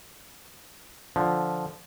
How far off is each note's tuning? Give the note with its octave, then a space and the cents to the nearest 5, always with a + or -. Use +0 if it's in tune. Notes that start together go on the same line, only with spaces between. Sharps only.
D3 +0 F3 +0